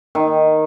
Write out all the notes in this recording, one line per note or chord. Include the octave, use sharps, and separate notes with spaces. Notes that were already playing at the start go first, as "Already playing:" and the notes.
D#3